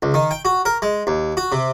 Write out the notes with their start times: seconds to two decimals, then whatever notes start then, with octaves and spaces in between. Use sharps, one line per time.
0.02 C#2
0.14 D#3
0.31 G5
0.45 F#4
0.65 A#4
0.82 G#3
1.07 D#2
1.37 F#4
1.52 C3